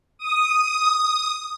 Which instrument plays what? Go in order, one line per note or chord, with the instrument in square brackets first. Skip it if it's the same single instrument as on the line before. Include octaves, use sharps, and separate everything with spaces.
[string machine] D#6